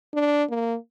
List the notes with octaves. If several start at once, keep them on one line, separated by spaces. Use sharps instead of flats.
D4
A#3